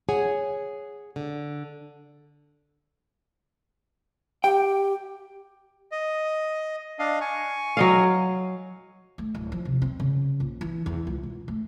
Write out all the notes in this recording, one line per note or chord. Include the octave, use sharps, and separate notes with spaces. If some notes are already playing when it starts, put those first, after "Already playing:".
G#4 C#5 F#5 G#5
D3
G4 G5
D#5
D4 D#5 F5
G#5 C#6
F#3 D#5 F5
A3
D1
F3
C3
C4
C#3
A#1
E3
E2
C#2
B2
A3